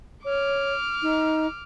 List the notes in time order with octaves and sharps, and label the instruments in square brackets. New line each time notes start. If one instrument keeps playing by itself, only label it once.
[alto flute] C#5 [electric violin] D6 F6
[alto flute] D#4